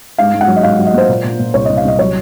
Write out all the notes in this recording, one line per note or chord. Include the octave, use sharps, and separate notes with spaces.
G#2 F5
G#2
F#5
F#3
D#5
G#2 F5
F#3
D#5
A#3 C5
A#2
A#2
A#2
C2 C#5
D#5
C2
F5
C2 D#5
F#3 C#5